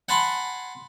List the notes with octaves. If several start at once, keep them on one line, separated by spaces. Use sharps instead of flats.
F#5 G#5 A5 B5 C6